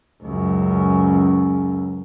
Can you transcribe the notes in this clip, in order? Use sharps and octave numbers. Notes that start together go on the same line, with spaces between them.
C#2 F#2